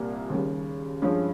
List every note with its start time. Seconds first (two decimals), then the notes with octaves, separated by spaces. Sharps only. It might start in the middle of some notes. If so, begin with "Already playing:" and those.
Already playing: C2 A#2 G3 A#3
0.30 D#2 C#3 G3
1.02 G2 F3 G#3 C#4